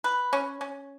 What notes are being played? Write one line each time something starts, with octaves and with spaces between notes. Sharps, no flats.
B4
C#4
C#4